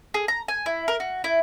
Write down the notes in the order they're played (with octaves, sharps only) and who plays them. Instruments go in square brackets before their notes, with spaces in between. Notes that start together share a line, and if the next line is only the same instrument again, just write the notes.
[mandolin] G#4
A#5
G#5
E4
A#4
F#4
E4